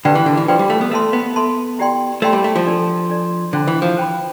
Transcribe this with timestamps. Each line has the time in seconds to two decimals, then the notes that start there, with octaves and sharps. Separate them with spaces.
0.05 D3 G4 B4 D5 G5 B5
0.15 E3
0.26 D3
0.37 E3
0.48 F3 G4 B4 D5 G5 B5
0.59 G3
0.70 A3
0.81 B3
0.91 A3 A4 E5 A5 C6
1.13 B3
1.36 A4 E5 A5 C6
1.79 E4 G4 D5 G5 C6
2.22 A3 E4 G4 D5 G5 C6
2.33 G3
2.44 A3
2.56 F3
2.66 D4 A4 D5
3.09 D4 A4 D5
3.53 D3 C5 G5 B5
3.68 E3
3.82 F3
3.97 C5 G5 B5